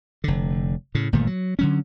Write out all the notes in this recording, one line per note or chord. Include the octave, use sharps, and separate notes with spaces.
F1 D3
A2 C#3
G1 A#2 D#3 A3
F#3
D3 F#3 C#4